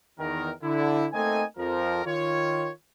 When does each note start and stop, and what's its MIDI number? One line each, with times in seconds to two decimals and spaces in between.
0.19 0.51 40
0.19 0.51 51
0.19 0.51 70
0.63 1.07 50
0.63 1.07 64
1.13 1.43 57
1.13 1.43 58
1.13 1.43 60
1.13 1.43 63
1.13 1.43 75
1.13 1.43 80
1.57 2.03 41
1.57 2.03 53
1.57 2.03 70
2.05 2.69 51
2.05 2.69 65
2.05 2.69 73